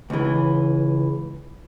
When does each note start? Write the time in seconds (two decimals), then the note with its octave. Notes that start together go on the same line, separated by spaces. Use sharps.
0.10 C#2 E3